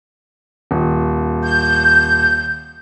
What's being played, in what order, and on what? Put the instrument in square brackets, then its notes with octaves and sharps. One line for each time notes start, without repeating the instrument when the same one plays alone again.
[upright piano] D#1
[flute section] G6